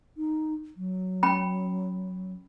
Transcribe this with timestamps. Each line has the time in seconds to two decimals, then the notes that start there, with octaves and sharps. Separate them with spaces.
0.17 D#4
0.77 F#3
1.23 C#4 G5 B5